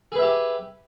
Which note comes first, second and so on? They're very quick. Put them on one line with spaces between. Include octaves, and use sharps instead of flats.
G#4 B4 E5 G4